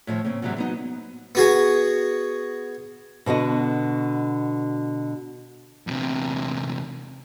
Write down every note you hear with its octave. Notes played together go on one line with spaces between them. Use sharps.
A2 D#3 F3
C#3 A#3 C4
G#2 C3 E3 F#3 G3
F#3 B3 D#4
B3 F#4 G#4
B2 D3 F#4 D#5
E2 C3